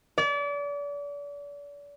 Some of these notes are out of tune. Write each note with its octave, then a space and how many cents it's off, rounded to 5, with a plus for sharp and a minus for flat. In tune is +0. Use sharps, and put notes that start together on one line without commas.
D5 -35